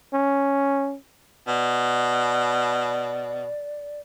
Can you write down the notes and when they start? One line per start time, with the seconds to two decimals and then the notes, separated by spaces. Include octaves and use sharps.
0.13 C#4
1.47 B2 D5